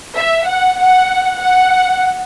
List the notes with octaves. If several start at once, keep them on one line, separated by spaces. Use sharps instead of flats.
E5
F#5
F#5
F#5